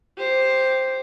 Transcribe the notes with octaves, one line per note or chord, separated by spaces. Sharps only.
G4 C5